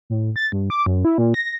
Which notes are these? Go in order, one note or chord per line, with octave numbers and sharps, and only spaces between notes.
A2
A6
G2
D6
F#2
E4
A#2
A#6